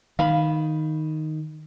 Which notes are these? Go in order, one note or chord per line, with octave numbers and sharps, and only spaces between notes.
D#3 F5 B5